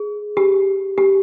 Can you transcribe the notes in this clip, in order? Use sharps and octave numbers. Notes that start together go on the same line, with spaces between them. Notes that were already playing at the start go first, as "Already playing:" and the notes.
Already playing: G#4
G4
G4